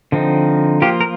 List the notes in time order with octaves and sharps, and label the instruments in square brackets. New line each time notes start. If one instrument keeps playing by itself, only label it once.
[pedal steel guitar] D3 F3 C4 D#4
F3 A#3 F4 G4
A#4